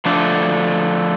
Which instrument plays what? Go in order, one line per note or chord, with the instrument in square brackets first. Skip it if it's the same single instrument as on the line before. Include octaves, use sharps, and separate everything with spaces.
[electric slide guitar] D3 F3 A3 D4